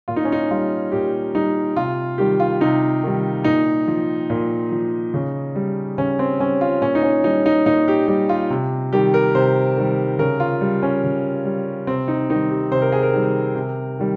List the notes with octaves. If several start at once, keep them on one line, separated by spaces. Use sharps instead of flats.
A#2 F4
D#4
C#4
D#4
G3 F4
A#2 G4
G3 D#4
C3 F4
D#3 G3 G4
F4
C3 D#4
D#3 G3
A#2 D#4
F3
A#2
F3
C#3
G3
C#3 C#4
C4
G3 C#4
F4
A#2 C#4
D#4
C#4
G3 D#4
D#4
A#2 D#4
G4
G3 G4
F4
C3
D#3 G3 G4
A#4
C3 C5
D#3 G3
C#3 A#4
F4
G3
C#4
C#3
G3
C3 C4
D#4
D#3 G3 D#4
G4
C3 C5
A#4
G#4
A#4
D#3 G3
C3
D#3 G3